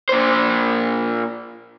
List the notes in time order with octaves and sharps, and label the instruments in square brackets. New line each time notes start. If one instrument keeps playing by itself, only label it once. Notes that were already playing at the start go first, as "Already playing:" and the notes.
[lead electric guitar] A#2 C5